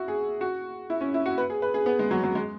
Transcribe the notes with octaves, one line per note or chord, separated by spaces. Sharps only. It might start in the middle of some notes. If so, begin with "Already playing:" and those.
Already playing: E4 F#4
G#4
F#4
E4
C#4
E4
F#4
B4
G#4
B4
G#4
B3
G#3
F#3
F#3
G#3